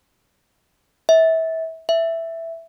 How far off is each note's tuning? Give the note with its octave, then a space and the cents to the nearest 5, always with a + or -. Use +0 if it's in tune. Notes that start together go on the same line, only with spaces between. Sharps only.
E5 -30
E5 +5